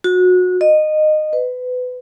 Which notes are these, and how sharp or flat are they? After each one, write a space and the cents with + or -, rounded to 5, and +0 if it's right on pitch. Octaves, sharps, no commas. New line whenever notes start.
F#4 -25
D#5 -20
B4 +25